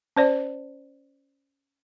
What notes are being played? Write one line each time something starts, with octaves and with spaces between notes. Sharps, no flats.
C#4 C5 D5